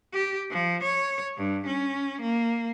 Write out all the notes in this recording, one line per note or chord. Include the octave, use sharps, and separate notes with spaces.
G4
F3
C#5
G2
C#4
A#3